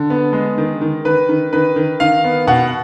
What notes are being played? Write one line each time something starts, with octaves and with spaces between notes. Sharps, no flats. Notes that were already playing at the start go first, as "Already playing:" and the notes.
Already playing: D3
B3
G#3
D#3
D#3
D#3 B4
D#3
D#3 B4
D#3
D#3 F5
B3
B2 F#5